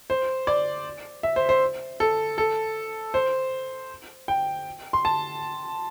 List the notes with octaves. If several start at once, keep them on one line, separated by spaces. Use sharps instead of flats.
C5
D5
E5
C5
C5
A4
A4
C5
G5
C6
A5